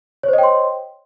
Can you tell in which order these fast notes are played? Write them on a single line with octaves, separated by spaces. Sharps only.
C#5 C5 D#5 G5 C6